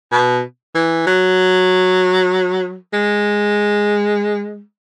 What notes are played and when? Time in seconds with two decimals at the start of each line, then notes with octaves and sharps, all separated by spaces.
0.12 B2
0.75 E3
1.07 F#3
2.93 G#3